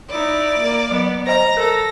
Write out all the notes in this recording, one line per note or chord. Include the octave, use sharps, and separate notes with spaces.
D#4 E4 D5
A#3 A#4
F#3 B3
C5 D#5 A#5 A#6
A4 A#4